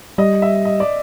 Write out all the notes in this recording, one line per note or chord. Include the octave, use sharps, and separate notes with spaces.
G3 D#5
E5
D#5
D5